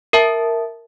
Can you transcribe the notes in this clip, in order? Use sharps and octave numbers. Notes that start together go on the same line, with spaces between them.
A#4 E5 A5